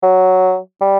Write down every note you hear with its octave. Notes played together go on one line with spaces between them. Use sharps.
F#3
G3